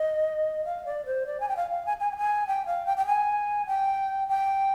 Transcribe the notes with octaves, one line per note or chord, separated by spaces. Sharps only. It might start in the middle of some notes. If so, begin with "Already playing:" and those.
Already playing: D#5
F5
D5
C5
D5
G#5
G5
F5
F5
G#5
G#5
G5
G#5
G5
F5
G5
G5
G#5
G5
G5